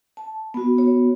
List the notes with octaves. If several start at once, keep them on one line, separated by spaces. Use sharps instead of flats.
A5
B3 F#4
C#5